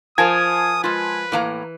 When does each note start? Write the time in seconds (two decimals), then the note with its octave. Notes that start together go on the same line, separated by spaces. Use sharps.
0.18 F3 F4 A#4 C5 G#5 A5 D#6 G#6
0.84 G#3 F4 B4
1.32 A2 E3 A#3 A#5